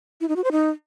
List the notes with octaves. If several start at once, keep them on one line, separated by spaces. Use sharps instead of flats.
E4
D#4
F#4
C5
D#4